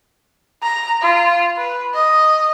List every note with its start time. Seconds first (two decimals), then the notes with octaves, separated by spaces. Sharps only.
0.63 A#5
1.02 F4
1.57 B4
1.94 D#5